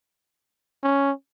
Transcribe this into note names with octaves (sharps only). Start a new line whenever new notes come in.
C#4